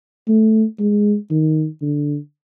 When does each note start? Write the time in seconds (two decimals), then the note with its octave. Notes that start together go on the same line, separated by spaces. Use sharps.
0.28 A3
0.79 G#3
1.30 D#3
1.81 D3